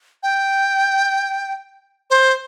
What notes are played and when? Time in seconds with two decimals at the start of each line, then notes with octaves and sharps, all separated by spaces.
0.23 G5
2.10 C5